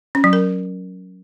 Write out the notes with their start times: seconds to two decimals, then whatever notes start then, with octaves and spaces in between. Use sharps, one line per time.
0.15 C#4
0.24 F#3
0.33 A#4